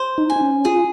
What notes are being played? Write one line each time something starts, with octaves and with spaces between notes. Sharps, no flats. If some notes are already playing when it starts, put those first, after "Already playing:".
Already playing: C5
D#4
G#5
D#4
C#4
F4 G#4